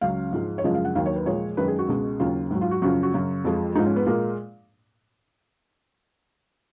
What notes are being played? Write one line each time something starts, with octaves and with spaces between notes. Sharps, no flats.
C#2 C#3 F#3 F5
G#2 F3 G#3
C#5
F#2 C#3 F3 G#3 D#5
F5
F#5
D#2 D#3 F#3 F5
C#5
B4
A#2 F3 G#3 C#5
F#2 D#3 G#3 B4
G#4
F#4
C#2 B2 G#3
D#2 C#3 F#3 F4
G#2 F#3
F4
F#4
F#2 C#3 F3 F#4
F#4
F#2 C#3 F#3
F2 F3 G#3
G#2 F3 G#3 D#4
C#4
B3
A#2 G#3 A#3